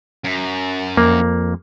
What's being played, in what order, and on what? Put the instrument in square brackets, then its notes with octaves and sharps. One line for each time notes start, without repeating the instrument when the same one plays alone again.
[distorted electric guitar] F#2
[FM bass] F2 [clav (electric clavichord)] A#3